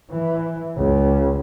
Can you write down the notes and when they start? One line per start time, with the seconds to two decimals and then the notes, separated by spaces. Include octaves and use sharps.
0.11 E3
0.77 C#2